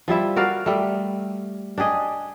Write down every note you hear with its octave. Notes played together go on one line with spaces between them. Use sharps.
F3 G3 E4 E5
F#4 A#4 D5 F5
G3 A3
D4 G4 G#4 D#5